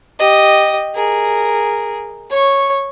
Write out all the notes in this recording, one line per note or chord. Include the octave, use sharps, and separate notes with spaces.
G4 D#5
G#4 A#4
C#5 C#6